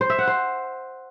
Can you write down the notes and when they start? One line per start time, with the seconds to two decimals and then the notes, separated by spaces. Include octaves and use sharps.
0.01 C5
0.10 E5
0.19 F#5
0.27 C5